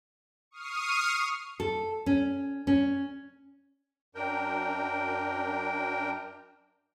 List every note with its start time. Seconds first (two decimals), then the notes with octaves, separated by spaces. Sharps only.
0.51 C#6 D#6 F6 C7 D#7
1.60 A4
2.06 C#4
2.67 C#4
4.15 F#2 D4 A#4 G5